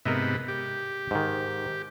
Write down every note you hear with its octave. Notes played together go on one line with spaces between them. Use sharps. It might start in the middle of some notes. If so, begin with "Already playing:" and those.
G#2 C3 B3 A#4 D#5 E5
G4
G#2 D#3